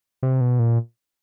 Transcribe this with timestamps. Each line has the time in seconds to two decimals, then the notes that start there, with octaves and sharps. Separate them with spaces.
0.23 C3
0.41 B2
0.59 A#2